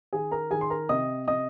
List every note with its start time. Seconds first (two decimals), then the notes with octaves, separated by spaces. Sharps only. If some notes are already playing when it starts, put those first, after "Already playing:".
0.13 D#3 G#4 G#5
0.32 A#4 A#5
0.51 D#3 G#4 G#5
0.61 C6
0.70 A#4 A#5
0.89 C3 D#5 D#6
1.27 C3 D#5 D#6